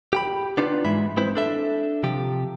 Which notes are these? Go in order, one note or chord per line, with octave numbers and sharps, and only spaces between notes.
G4 G5 B5
B3 D4 D#4 F4 B4
G#2 E3 G#3 E5 B5
G#3 C4 E4 B4 C5
D4 A4 E5
C3 F3 G4